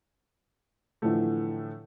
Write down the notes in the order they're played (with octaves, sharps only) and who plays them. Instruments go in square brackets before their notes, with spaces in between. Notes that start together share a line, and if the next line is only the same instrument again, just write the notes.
[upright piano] A2 D3 E3 F3 A3